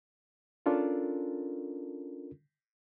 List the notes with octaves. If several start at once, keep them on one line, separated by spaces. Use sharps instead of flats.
C#4 D4 F4 A4 A#4